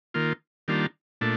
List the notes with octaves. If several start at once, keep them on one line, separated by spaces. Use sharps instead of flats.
D#3 A#3 F4
D#3 G3 A#3 D4 F4
A#2 A3 D4